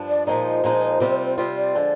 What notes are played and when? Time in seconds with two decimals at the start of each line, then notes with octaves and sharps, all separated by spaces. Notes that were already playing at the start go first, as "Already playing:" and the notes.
Already playing: G2 F3 D4
0.08 D5
0.26 A#2 F3 G#3 D#4 C5 D5
0.64 A#2 F3 G#3 D#4
1.00 C3 G3 C4 F4
1.38 C3 G3 C4 F4
1.56 D5
1.75 D3 F3 G#3